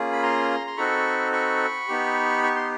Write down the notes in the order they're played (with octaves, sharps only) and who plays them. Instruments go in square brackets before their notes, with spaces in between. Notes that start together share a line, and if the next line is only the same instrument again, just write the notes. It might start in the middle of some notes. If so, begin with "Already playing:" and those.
Already playing: [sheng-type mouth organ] A#3 C#4 F4 G#4
B5
A#5 C6
C6
C4 D#4 F#4 A4 B5 C#6
B5 C#6
B3 D#4 G4
C#6
C6